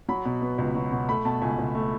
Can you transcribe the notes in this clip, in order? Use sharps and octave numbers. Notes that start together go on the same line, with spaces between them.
F#3 B5
B2
B3
C#2
F#3
B2
A3 B5
B2 A5
C#2 G#5
C#2
A3